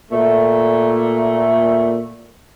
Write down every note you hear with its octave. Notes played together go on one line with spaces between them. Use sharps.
A#2 A3